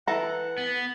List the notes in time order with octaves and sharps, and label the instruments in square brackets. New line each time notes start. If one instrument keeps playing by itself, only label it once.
[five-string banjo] E3 A4 A#5 [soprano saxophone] F#5
[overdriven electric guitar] B3